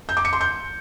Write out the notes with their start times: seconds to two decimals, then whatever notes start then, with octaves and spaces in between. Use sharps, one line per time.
0.09 G6
0.17 D6
0.25 C#7
0.33 C6
0.41 G6